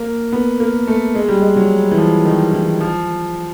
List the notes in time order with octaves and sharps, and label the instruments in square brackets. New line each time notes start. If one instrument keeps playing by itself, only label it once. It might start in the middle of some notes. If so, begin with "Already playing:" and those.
Already playing: [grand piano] A#3
B3
A#3
A3
G#3
G3
G#3
F#3
E3
F3
D#3
E3
F3